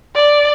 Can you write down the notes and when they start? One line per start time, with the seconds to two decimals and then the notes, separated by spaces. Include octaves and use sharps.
0.15 D5